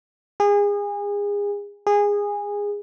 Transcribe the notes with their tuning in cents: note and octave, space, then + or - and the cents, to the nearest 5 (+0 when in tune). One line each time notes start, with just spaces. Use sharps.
G#4 -30
G#4 -20